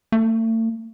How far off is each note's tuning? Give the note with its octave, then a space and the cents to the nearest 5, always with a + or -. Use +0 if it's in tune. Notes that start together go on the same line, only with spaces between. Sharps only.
A3 +40